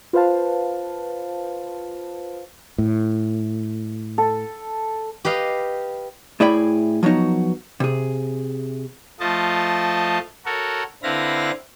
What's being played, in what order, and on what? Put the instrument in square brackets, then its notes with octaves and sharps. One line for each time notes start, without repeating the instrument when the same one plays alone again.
[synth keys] F4 B4 C5 F5 A5
[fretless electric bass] A2
[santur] A4 A5
[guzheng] G4 B4 D#5 F5
[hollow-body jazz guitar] A2 E4 G#4 D5 G5 B5
F3 F#3 B3 D#4 F#4
C3 G#4
[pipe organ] F3 A3 F4 D#5 A5
F#4 A4 A#4 C#5
D3 C4 E4 B4 F5 A#6